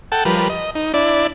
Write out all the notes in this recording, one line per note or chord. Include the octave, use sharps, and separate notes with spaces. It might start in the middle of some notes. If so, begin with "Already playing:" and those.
A4 F#5 G5 A5
F3 G3 A#4 B4
D#5
D#4
D4 E4 D5